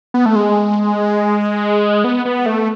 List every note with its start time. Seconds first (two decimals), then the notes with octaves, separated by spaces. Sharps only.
0.14 B3
0.26 A3
0.36 G#3
2.04 B3
2.25 B3
2.46 A3